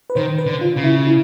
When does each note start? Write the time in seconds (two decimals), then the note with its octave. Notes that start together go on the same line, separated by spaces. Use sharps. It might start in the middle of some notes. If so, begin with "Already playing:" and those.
0.10 B4
0.16 D#3 C5
0.38 B4
0.46 D3
0.61 F4
0.76 C#3
0.84 E4
1.07 E4